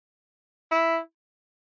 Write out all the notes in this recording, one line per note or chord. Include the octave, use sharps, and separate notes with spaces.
E4